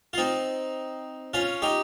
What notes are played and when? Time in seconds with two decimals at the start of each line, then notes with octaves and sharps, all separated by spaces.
0.13 F4
0.18 C4 D#4
1.34 C#4 F4
1.62 D#4 G4